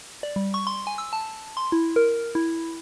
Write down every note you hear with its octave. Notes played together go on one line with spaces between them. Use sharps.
D5
G3
C#6
C6
G#5
E6
A5
C6
E4
A#4
E4